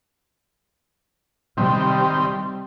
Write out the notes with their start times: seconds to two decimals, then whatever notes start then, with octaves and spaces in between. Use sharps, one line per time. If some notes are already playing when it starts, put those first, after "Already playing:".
1.57 C3 D#3 G3 C4 G4